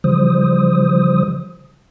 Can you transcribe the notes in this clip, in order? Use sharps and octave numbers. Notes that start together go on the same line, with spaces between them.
C#3 E3 F3 G3 C5 D#6